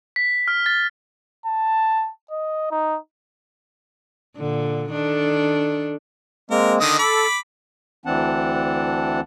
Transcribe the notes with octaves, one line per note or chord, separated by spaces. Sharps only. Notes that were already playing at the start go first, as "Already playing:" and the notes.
B6
F6
A6
A5
D#5
D#4
A#2 D3
D#3 D4 A4
G#3 A#3 C4 A#4
D3 D#3 D#5 D#6
A4 B5 D6
D2 E3 C4 D4 F#5 A5